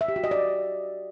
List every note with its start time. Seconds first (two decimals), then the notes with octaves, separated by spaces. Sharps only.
0.01 E5
0.08 G4
0.16 F#4
0.24 D#5
0.31 D5